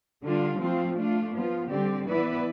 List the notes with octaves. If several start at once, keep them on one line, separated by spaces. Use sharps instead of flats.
D3 G3 D4 F4
F3 A3 C4 F4
A3 D4 F4
F3 B3 F4
D3 G3 C4 G4 D5
E3 B3 E4 B4 D5